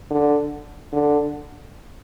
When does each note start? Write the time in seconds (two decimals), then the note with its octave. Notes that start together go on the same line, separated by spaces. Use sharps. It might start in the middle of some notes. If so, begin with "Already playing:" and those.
0.10 D3
0.93 D3